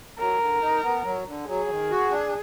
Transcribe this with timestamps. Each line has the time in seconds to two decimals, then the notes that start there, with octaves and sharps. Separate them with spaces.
0.19 F#3 A#4
0.40 D3
0.61 D#4
0.83 B3
1.05 F#3
1.26 D3
1.47 F#3 G#4
1.69 D#3
1.91 F#4
2.12 D4